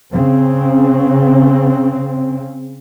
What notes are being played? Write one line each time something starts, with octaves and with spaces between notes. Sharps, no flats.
C#3 C4